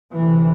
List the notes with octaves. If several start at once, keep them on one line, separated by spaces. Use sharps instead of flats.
D2 C3 E3